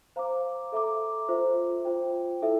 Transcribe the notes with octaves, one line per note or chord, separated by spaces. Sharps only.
C5 F5 A#5 D6
A4 E5 A#5 D6
F4 C5 E5
F4 C5 G5
E4 A4 E5